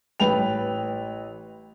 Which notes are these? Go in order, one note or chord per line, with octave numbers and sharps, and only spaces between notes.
A1 B4 G5 F7